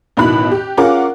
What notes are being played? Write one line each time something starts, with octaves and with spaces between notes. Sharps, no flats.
A1 B2 D#3 E4 B5 F#6
G4
C#4 F4 G#4 A#4 F#5 D6